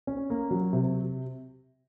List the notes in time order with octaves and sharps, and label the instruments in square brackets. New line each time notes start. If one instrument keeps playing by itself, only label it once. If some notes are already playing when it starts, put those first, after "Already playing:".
[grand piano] C#4
A#3
F#3
C3